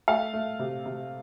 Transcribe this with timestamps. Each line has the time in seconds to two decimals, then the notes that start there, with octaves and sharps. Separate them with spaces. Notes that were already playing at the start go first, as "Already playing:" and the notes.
0.08 A3 F5
0.33 A3
0.59 C3
0.86 C3